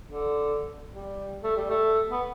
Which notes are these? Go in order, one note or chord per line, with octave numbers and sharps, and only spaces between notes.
D3
G3
A3
G3
A3
B3